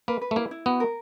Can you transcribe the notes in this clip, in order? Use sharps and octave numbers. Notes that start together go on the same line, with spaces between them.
A#3 B4
B4
A3
A#3 E4
E4
B3 F#4
A#4